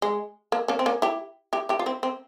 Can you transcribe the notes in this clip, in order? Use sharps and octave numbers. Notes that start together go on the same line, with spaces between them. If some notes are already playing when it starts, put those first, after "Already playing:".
G#3
A#3
A#3 C#4
C4
A#3 C#4
E4 G4
E4 G4
E4 G4
F4
C4 E4
C4